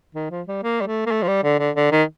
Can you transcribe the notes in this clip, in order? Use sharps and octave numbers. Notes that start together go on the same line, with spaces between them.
D#3
F3
G3
A#3
G3
A3
A#3
A3
F3
G3
D3
D3
D3
D#3